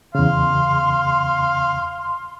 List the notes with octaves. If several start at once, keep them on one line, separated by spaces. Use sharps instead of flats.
E2 C#3 F5 C6